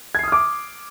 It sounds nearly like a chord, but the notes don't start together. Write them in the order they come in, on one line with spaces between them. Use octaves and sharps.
G#6 C7 D#6 F6 D6